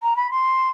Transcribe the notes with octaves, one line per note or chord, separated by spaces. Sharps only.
A#5
B5
C6